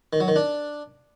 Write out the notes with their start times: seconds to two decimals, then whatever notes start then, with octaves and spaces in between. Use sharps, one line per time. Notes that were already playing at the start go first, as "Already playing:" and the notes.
0.13 D#3
0.20 F#3
0.28 D#3
0.36 D4